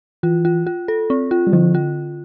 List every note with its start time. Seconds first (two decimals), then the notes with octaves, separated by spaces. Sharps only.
0.23 E3 F4
0.45 F4
0.67 F4
0.88 A4
1.10 C4
1.31 F4
1.47 G3
1.53 D3 F3
1.75 F4